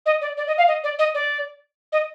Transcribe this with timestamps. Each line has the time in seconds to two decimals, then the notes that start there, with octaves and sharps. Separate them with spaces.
0.06 D#5
0.21 D5
0.37 D5
0.47 D#5
0.58 F5
0.68 D#5
0.83 D5
0.99 D#5
1.14 D5
1.92 D#5